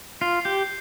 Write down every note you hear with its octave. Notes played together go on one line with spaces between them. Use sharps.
F4 C7
G4 G6